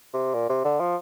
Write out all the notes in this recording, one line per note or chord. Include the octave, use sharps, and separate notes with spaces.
C3
A#2
C3
D3
F3